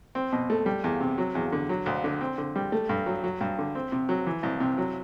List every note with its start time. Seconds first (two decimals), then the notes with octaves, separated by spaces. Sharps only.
0.15 C4
0.32 B2
0.50 A3
0.66 G3
0.84 E2
1.00 C3
1.18 F#3
1.35 E2
1.52 D3
1.69 F#3
1.86 D2
2.04 D3
2.21 C4
2.38 D3
2.56 G3
2.72 A3
2.89 G2
3.06 F#3
3.24 F#3
3.41 G2
3.59 D3
3.75 C4
3.92 C3
4.09 F#3
4.27 E3
4.43 C2
4.60 C3
4.78 F#3